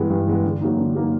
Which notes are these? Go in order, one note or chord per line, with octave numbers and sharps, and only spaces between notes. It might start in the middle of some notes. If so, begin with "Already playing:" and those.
Already playing: G2 E3 G#3 B3
G2
E3 G#3 B3
D3
F#3 A#3 D#4
D3
F#3 A#3 D#4